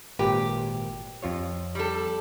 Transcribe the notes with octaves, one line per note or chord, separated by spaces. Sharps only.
G#1 A#2 G4 B4
F2 F4 C#5
G3 A4